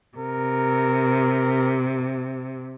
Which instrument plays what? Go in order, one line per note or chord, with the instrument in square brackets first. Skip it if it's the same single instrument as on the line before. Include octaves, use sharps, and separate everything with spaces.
[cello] C3 [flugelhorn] A#4